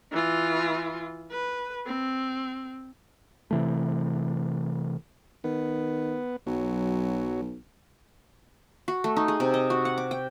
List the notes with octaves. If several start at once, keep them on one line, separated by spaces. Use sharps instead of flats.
E3 F4
B4
C4
C3 E3 A3
D#3 B3
B1 F#3
F#4
A3
D#4
G#4
C3
D#5
F#4
F#5
D6
G5